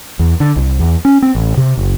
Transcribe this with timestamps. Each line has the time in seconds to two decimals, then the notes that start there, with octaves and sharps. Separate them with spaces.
0.19 E2
0.40 D3
0.56 C2
0.79 E2
1.05 C#4
1.22 C4
1.35 A1
1.57 C3
1.77 F#1